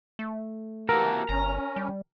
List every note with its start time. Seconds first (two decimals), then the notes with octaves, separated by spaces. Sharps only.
0.19 A3
0.89 C3 E3 A#3 F#4 A4 A#4
1.29 G1 C#4 A#5
1.76 G3